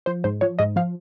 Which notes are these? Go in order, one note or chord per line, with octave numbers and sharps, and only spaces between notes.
F3 C5
G#2 C5
F3 C#5
G#2 D#5
F3 F5